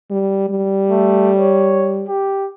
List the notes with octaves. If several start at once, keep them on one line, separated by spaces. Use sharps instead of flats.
G3
G3
A3
C#5
G4